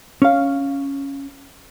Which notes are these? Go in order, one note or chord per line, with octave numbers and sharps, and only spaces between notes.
C#4 F5